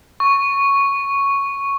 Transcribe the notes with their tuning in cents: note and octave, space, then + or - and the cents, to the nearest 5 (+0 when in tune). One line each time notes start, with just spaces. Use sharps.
C#6 +0